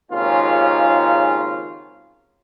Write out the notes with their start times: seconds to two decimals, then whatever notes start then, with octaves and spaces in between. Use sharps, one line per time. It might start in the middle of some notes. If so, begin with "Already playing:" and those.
0.11 G#1 D#2 C#3 C#4 F4